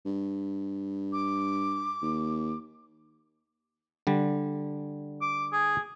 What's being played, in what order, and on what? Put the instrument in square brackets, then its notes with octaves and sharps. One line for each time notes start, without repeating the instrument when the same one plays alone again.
[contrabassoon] G2
[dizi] D6
[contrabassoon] D#2
[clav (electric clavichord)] D3 G3
[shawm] D6
G#4